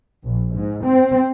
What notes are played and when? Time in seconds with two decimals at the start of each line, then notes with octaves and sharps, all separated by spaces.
0.25 A#1
0.56 G#2
0.85 C4